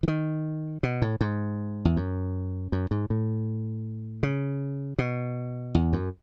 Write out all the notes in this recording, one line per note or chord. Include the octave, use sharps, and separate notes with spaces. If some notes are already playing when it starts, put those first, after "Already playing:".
E3
D#3
B2
A2
G#2
E2
F#2
F#2
G#2
A2
C#3
B2
E2
F#2